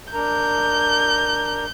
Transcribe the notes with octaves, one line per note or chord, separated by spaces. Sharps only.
D4 A#4 A#5 G6